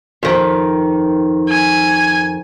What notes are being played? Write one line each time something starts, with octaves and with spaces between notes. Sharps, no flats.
F2 D#3
G#5